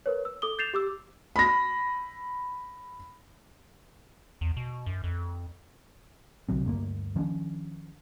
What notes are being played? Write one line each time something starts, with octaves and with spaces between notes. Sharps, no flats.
A#4 B4 C#5
E6
A4 D6 D#6 G7
G6 A6 C7 E7 F7
G4 D6 E6
B5 A#6
E2
B2
F#2
F2
C2 D3 F#3 C4
D2 G2 G#3 A#3
D#3 F3 C#4 D4